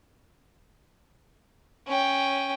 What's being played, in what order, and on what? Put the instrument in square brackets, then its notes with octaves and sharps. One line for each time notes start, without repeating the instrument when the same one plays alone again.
[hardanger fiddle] C#4 G5